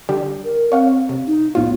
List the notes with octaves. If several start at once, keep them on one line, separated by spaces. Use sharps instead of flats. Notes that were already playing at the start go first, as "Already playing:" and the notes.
D3 G3 G4
A#4
C4 C#5 F5 F#5
C3
D#4
A#1 A2 B3 F4